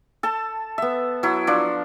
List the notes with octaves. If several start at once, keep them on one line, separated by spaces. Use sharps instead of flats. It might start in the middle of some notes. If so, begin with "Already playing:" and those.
A4 A5
B3 E5
F#3 E4
F3 D4